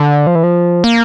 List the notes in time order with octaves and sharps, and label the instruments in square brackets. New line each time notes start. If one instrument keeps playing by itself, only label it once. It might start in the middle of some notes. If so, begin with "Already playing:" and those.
Already playing: [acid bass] D3
F3
E3
F3
A#3